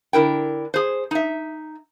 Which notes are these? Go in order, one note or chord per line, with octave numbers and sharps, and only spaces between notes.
D3 E4 A#4 G5
G#4 C5
D#4 E5